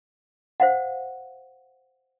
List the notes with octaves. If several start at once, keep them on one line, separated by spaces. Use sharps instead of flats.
C5 F5 F#5